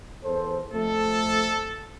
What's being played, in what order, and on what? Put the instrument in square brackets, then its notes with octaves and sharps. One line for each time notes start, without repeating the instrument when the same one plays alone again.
[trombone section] E2 A4 C5
[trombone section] F2 A3 [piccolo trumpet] A4